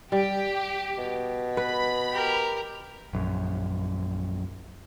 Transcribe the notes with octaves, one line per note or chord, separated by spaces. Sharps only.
G3 G4
B2
B4 B5
G4 A#4
A#1 F#2